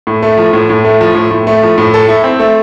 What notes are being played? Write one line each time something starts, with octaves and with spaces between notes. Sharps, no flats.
A2
A3
F3
A2
A2
A3
F3
A2
A2
A3
F3
A2
A4
E4
C4
A3